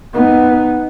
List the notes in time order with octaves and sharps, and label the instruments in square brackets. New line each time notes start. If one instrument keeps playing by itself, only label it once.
[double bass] B3 D#4